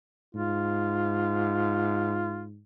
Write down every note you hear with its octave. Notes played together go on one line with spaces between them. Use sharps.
G#2 F4